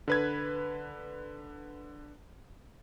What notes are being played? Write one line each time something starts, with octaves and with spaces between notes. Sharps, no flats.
D3 B4 G#6